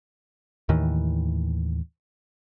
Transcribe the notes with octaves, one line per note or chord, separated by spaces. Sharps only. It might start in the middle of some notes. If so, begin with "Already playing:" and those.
D#2 A2 D#3 E3